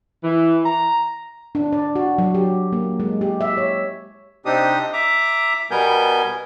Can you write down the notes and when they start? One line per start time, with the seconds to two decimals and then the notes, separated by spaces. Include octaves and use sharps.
0.23 E3
0.64 A#5
1.55 D4
1.73 D5
1.95 F#4
2.18 F#3
2.34 G4
2.73 A#3
3.00 G#3
3.21 G4
3.41 E5
3.57 C#5
4.46 C3 C4 D4 D#4 G4 D#6
4.93 E5 A#5 D6
5.71 B2 G3 B3 A#4 G#5 G6